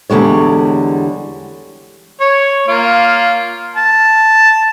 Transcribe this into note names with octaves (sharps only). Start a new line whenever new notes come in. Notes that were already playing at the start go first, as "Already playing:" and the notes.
E2 D3 G3 G#3 C#5
C#5
A#3 F4
A5